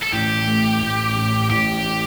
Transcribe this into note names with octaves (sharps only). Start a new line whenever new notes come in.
A4
A1 G4
A3
A1
A2
A1 G4
A3